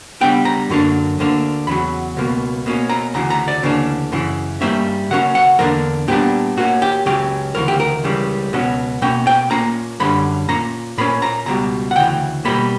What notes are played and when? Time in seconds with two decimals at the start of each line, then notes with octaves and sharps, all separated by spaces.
0.21 C#3 G3 B3 D4 G5
0.45 A#5
0.69 F#2 D3 F#3 A#3 D4
1.19 D2 D3 A#3 D4
1.67 E2 C#3 F#3 B5
2.17 C#2 B2 A#3
2.66 B2 A#3 C#4
2.90 A#5
3.14 D2 C#3 E3 A#5
3.30 A#5
3.48 D5
3.63 D2 C#3 E3 A#3 D4
4.12 F#2 C#3 E3
4.61 G2 D3 G3 A#3 C#4 E5
5.11 C#3 F#3 A#3 C#4 F#5
5.35 F#5
5.59 E2 D3 A#3 D4 A#4
6.08 A#2 G3 B3 D4 G4
6.57 A#2 A#3 C#4 F#4
6.82 G4
7.06 C#2 C#3 F#3 C#4 G4
7.55 D2 C#3 E3 A#4
7.68 G4
7.80 A#4
8.04 C#2 C#3 E3 G3
8.53 C#2 B2 F#3 C#4
9.02 B2 A#3 C#4 G5
9.27 G5
9.51 A#2 A#3 C#4 A#5
10.00 F#2 D3 G3 C#4 B5
10.49 A#2 A#3 C#4 A#5
10.98 A#2 A#3 C#4 B5
11.22 A#5
11.46 C#2 B2 G3 A#5
11.91 F#5
11.96 D2 C#3 E3 G5
12.45 B2 G3 A#3 B5